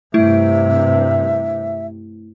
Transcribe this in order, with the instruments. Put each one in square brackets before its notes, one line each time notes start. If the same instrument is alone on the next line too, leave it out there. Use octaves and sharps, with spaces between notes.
[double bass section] G2 C3 [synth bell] A3 E4 [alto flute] E5